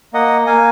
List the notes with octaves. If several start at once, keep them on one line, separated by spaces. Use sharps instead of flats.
A#3 D#5 F#5
A#3 F5 G#5